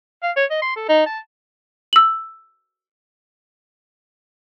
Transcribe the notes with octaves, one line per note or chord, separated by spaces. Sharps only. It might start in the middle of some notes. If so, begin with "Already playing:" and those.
F5
C#5
D#5
C6
A4
D#4
A5
E6 F#7